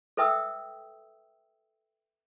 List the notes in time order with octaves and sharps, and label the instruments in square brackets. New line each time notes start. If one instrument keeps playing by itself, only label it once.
[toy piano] A4 B4 E5 G5 D#6 E6